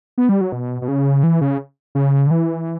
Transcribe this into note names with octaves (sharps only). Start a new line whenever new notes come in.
B3
G3
F#3
B2
B2
C#3
E3
C#3
C#3
D3
E3